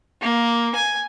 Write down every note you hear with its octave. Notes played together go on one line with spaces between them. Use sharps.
A#3
G#5